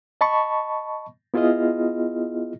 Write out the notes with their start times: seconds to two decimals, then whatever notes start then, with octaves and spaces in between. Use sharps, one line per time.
0.21 D#5 A5 B5 C#6
1.34 B3 E4 F4 G#4 D#5 F6